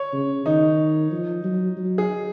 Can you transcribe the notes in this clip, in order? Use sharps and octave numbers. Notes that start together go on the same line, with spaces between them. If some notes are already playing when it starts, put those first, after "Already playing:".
Already playing: C#5
C#3
D#3 D#4
F3
F#3
F#3
G#4